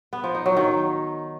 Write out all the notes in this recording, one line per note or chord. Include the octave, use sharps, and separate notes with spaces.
B3
F3
D#4
F#3
D#3